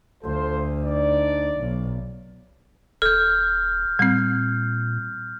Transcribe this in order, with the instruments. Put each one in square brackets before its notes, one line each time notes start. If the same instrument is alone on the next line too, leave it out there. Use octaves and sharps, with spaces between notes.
[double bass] D2 [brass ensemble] F4 A4 C5
[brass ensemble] D4 D#4 D5
[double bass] B1
[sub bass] D1 [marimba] A4 [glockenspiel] F6 G6
[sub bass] A#2 [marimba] G3 C4